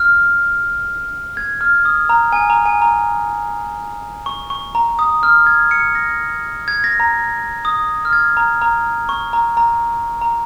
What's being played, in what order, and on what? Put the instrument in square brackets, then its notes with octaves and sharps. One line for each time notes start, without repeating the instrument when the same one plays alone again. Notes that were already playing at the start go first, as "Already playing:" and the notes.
Already playing: [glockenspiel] F6
G#6
F6
D#6
A#5
G#5
A#5
G#5
A#5
C#6
C#6
A#5
D#6
F6
G#6
C#7
A#6
G#6
A#6
A#5
D#6
F6
G#6
A#5
A#5
C#6
A#5
A#5
A#5